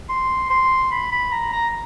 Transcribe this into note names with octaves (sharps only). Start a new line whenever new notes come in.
C6
C6
B5
B5
A#5
A#5